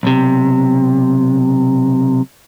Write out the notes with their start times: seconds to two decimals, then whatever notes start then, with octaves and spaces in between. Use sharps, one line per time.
0.03 B1 C3